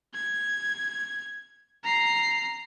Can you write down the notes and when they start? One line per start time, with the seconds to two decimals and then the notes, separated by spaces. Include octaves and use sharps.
0.14 G#6
1.84 A#5 C7